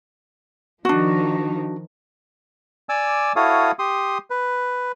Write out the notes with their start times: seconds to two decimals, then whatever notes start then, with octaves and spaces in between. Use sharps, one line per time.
0.85 D#3 F3 D4 D#4 F#4
2.89 D5 G#5 D6 E6
3.36 E4 F#4 A4 C#5 F5 D#6
3.79 G4 C6 D#6
4.30 B4